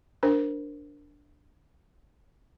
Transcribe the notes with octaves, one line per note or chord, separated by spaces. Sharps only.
D4 A#4 C5